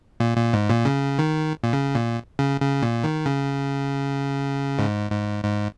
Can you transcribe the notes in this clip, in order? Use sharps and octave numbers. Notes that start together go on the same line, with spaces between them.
A#2
A#2
G#2
A#2
C#3
D#3
A#2
C#3
A#2
C#3
C#3
A#2
D#3
C#3
G#2
G#2
G#2